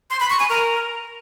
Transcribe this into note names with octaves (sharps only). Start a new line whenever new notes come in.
C6
B5
C#6
G#5
A#4